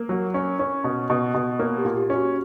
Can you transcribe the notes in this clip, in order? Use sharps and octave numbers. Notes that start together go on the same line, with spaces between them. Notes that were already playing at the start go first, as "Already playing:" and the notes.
Already playing: A#3 A#4
F#3
C#4
C#4
B2
B2
B2
A#3 C#5
G4
A#2
G4
C#4
F#4